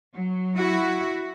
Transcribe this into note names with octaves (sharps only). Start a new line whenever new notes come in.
F#3
E4 F#4